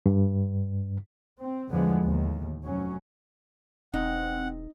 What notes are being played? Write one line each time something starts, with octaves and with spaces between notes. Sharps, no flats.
G2
C4
E2 A2 D3 F3 G#3 B3
D#2 A2
F1 F#3 C#4
E1 C4 D#4 F#5